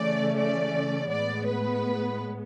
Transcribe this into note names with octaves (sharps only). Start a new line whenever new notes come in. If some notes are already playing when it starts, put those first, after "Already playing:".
Already playing: C#3 E3 A3 C#4 D5
D5
A2 G#3 B3 D5
B4